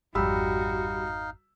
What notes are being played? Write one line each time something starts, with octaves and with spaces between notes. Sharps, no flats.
G#1 F2 G3 D#4 F#4 F5 B5 E6